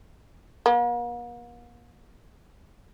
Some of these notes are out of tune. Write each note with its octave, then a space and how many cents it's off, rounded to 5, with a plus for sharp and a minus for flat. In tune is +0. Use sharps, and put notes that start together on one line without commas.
A#3 +45